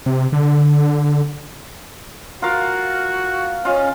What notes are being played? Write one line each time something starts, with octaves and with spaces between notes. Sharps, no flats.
C3
D3
F4 F#4 A#4 F5
C#4 F4 D#5 F5